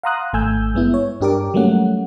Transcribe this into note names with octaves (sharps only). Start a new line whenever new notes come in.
F5 F#5 A#5 C6 D#6 F#6
G#1 A3 G#5 E6 G6
G2 G#3 B3 E4
C#5
G2 D4 G4 A#4 D5 D6
F#3 G3 A3 A#3 C#4 F#5